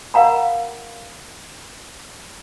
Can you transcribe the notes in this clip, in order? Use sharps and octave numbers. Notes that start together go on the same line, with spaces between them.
A#4 F5 F#5 A#5 B5